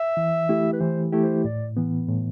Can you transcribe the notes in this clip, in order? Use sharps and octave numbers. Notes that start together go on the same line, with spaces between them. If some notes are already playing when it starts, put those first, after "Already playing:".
Already playing: E5
E3
A3 E4 G4
B4
E3 C5
A3 E4 G4
C5
A2 D5
E3 B3
A2